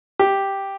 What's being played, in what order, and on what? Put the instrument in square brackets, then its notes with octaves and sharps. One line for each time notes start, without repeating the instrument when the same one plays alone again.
[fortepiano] G4